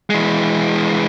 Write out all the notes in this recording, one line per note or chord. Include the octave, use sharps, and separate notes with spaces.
E3 G#3